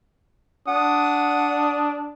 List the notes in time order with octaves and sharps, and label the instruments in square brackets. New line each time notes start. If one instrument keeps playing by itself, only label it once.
[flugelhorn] D4 [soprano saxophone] F#5 [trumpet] D#6